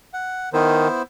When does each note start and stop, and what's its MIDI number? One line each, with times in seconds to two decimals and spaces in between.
0.14 0.49 78
0.53 0.88 51
0.53 1.02 59
0.53 1.02 64
0.53 1.02 72